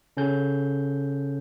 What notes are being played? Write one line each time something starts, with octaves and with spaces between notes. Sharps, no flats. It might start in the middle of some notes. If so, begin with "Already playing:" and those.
C#3 C#4 A4 G6